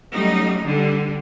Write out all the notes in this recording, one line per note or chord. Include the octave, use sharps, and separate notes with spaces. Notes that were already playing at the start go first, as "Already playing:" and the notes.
F#3 G3 A3 C#4 D#4
D3 G3